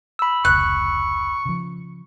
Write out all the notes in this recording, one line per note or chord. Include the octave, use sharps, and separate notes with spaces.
B5 E6
F1 C#2 C#6 F#6
C#3 F3